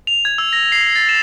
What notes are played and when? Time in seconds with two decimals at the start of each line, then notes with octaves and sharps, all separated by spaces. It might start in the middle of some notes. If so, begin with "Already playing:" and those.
0.07 F7
0.25 G#6
0.38 E6
0.53 A#6
0.72 C7
0.96 A6
1.09 E7